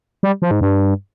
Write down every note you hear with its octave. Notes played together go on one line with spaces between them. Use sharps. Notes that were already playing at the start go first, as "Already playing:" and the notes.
G3
F3
G#2
G2